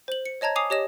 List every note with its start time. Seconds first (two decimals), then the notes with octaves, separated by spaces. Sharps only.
0.08 C5 F#7
0.26 C#7
0.41 C#5 D#5 A5 A#5 G#6
0.56 G#5 D6 D#6 C7 F7
0.70 G4 C#5 D#5 E7